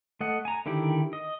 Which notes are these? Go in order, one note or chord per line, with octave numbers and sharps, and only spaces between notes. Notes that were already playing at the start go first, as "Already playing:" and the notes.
A3 D#5 F#5
G#5 A#5
D3 D#3 E4 G4 D5
D#5